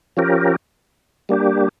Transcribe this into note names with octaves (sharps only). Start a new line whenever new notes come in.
F3 C#4 G4 A#4
G3 A#3 D4 G4